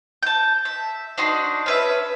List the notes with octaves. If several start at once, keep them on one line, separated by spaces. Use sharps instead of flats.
A5 G6
E5
D4 D#4 F#4 C6
C#4 B4 E5